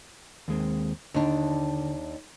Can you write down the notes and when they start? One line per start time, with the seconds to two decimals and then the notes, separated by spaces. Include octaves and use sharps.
0.48 D#2 G#3 C4
1.14 D#2 D3 D4